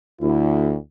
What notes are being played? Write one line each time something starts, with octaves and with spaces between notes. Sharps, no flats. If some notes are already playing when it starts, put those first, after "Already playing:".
D2 E4